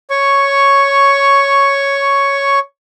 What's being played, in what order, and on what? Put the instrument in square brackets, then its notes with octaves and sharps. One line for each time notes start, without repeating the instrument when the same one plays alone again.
[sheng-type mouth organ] C#5 C#6